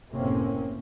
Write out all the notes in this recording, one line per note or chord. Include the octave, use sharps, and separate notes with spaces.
F#1 A2 C3 A#3 C4 C#4